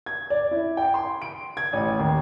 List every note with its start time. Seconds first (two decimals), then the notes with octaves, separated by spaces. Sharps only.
0.06 G#6
0.30 D5
0.51 E4
0.77 G5
0.94 C6
1.22 D7
1.57 G#6
1.73 A1
1.99 D#2